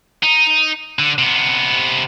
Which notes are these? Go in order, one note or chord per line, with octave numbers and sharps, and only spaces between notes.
D#4
D3
C3 B3